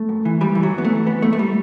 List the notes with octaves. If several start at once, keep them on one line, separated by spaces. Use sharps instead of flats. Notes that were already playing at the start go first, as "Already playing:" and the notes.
Already playing: A3
F#2
E3
E3 G3
F#2 E3
F#3
F#2 B3
A3
E3
E3 B3
F#2 A3
A3
G3